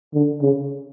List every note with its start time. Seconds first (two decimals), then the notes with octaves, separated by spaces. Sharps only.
0.14 D3
0.42 C#3